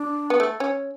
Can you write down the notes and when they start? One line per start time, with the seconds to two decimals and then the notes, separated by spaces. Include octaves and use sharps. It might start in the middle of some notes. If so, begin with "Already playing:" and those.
Already playing: D4
0.30 B3
0.40 A3
0.60 C#4